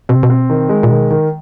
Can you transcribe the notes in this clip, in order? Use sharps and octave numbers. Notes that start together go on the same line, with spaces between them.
B2 C4
C3
B2
C4
D#3
G#3
A#2
B2 D#3
D#3